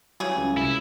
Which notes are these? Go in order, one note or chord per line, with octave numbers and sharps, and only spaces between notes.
C#3 E3 F#3 G3 G#4
C#2
C2 E4